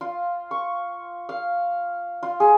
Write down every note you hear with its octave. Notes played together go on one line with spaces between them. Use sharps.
F4
C#6
F5
F4
G#4